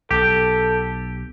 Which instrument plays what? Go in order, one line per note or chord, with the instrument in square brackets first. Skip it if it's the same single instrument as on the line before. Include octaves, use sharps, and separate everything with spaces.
[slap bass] B1 [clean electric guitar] G4 [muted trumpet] A4